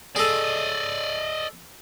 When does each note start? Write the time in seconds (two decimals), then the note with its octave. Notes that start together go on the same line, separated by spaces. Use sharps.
0.16 G#4 A4 D5 D#5